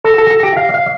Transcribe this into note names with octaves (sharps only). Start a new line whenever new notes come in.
A4 A#6
A4
A#6
A4
G4 A#6
F5 C7
F5